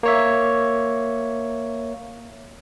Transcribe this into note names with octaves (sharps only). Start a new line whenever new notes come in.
A#3 C#5 E5